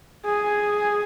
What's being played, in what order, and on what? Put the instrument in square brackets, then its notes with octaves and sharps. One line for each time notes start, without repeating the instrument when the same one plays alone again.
[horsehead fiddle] G#4